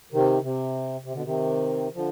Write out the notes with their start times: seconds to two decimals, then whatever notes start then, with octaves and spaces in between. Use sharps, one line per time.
0.12 C3 D#3
0.42 C3
1.04 C3
1.13 B2 D3
1.24 C3 D#3
1.94 D3 F3